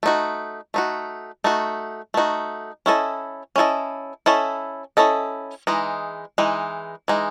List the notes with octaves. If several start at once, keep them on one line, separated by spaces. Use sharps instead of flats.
A3 D#4 F#4
A3 D#4 F#4
A3 D#4 F#4
A3 D#4 F#4
C#4 E4 A4 D#5
C#4 E4 A4 D#5
C#4 E4 A4 D#5
C#4 E4 A4 D#5
E3 G#3 D#4
E3 G#3 D#4
E3 G#3 D#4